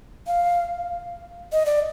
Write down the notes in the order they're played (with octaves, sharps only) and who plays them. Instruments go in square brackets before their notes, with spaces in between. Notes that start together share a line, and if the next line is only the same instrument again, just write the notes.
[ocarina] F5
D#5
D5